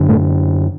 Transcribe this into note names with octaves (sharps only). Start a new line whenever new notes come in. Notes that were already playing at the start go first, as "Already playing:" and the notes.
Already playing: F#2 D3
A2 A3